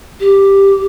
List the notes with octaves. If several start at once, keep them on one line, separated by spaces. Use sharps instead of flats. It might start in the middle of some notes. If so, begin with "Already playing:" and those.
G4